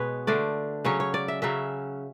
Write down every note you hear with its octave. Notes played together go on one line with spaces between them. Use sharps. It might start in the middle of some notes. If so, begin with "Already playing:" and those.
Already playing: B2 G#3 B3 B4 C#5
D3 A3 D4 D5
C#3 F#3 C#4 C#5
C#5
D5
E5
C#3 F#3 C#4 E5